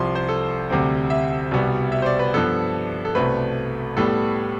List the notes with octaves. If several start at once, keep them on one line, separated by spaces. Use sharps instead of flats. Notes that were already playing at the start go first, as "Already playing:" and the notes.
Already playing: C2 C3 F3 C6
C5
A4
D2 C3 G3 C4
E5
C2 B2 G3 B3
E5
C5
D5
B4
G2 F3 B3 A4
A4
C2 B2 A3 C4 B4
A2 G3 B3 A4